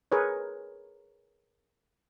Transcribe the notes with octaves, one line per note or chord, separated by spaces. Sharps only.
G#4 A#4 B4 C#5